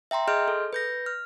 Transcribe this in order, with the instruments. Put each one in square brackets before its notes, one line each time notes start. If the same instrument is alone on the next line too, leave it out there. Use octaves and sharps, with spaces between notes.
[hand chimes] E5 G5 A#5 C6
G#4 D#5 C6 F6 G6
A4
B4 G6 A#6
F6